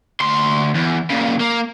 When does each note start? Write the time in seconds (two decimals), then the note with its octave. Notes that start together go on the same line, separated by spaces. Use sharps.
0.20 D2 C6
0.74 E2
1.10 A#2 C#3
1.40 A#3